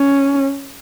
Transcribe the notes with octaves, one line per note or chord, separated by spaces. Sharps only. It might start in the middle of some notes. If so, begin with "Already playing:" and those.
Already playing: C#4